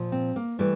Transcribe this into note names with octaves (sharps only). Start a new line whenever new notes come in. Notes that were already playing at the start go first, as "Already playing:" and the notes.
Already playing: A#2 F3
C4
A#3
E3 G3 A3